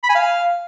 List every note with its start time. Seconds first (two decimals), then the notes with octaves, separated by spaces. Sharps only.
0.03 B5
0.09 G#5
0.15 F5